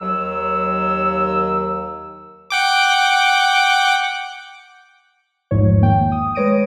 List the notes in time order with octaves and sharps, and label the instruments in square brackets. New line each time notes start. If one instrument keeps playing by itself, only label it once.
[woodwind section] D#2 F#3 E6
[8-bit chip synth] F#5 G5 D6
[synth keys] A1 E2 G#2 F3 C#5
D#3 A#3 G5
D#6
G#3 B4 C#5 A#6 D7 D#7